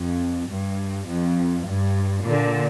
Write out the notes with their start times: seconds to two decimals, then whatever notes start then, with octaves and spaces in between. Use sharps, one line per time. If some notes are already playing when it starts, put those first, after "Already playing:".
Already playing: F2
0.51 G2
1.09 F2
1.68 G2
2.26 A#2 D3